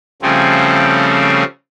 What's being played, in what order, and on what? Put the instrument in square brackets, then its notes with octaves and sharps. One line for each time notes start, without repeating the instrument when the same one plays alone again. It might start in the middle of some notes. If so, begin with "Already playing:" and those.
[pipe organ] C#3 F3 G3 A3 C4 C#4